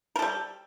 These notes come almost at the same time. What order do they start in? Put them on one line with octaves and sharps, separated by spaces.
A#4 A4 G3